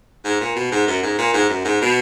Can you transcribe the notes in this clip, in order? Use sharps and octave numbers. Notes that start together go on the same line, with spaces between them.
G#2
A#2
B2
G#2
F#2
G#2
A#2
G#2
F#2
G#2
B2